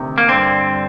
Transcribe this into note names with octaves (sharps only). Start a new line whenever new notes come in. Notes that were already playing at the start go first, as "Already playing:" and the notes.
Already playing: D2 C3 D#3
A#3
G2 D3 C4